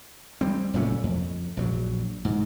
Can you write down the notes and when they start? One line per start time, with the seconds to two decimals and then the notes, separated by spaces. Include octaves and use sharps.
0.41 G3 C4
0.74 F#1 A#2 A3 C#4
1.03 F2
1.57 A#1 F3 F#3
2.25 G#2